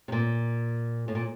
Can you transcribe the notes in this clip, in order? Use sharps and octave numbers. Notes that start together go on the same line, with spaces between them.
C3
A#2
A2
A#2